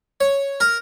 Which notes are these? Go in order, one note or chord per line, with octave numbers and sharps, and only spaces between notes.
C#5
A#4